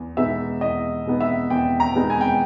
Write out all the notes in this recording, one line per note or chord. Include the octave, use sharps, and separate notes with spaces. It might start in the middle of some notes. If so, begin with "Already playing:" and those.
Already playing: E2
B2 G#3 B3 D#4 E5
E2 D#5
B2 G#3 B3 D#4
E5
E2 G5
A#5
B2 G#3 B3 D#4
G#5
G5